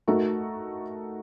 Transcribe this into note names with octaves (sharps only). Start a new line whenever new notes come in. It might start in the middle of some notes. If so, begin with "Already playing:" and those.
A3 D#4 F#4 A#4